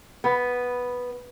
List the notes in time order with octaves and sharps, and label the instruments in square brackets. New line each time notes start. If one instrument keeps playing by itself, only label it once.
[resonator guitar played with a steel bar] B3